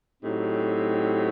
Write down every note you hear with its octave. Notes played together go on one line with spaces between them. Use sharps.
A2 F#3 C4 D#4 G4